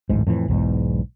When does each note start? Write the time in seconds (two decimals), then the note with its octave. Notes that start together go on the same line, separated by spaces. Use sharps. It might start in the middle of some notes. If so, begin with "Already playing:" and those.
0.09 D1 A1 G#2
0.27 F2 A2 C#3 E3
0.48 B1 E2 G#2